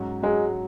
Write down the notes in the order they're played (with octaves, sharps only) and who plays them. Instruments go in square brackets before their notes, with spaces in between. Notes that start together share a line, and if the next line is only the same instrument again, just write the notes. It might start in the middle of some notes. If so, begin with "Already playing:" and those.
Already playing: [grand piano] G#2 F#3 C#4 F#4
[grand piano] G#2 F#3 C#4 F#4 [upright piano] G#3